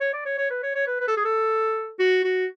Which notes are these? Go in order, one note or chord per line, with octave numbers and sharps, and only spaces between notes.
C#5
D5
C#5
C#5
B4
C#5
C#5
B4
B4
A4
G#4
A4
F#4
F#4